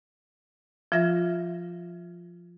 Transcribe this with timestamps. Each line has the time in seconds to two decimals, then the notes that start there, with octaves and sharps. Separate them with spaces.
0.92 F3 F4 E5 A#6